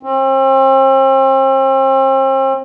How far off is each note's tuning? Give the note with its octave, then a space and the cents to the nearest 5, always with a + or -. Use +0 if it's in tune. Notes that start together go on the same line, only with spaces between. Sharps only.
C4 +40